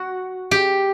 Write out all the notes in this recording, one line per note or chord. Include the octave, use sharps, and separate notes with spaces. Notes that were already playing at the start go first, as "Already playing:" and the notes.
Already playing: F#4
G4